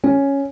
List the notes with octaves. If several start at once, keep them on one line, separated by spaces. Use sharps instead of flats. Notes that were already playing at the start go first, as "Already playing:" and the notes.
C#4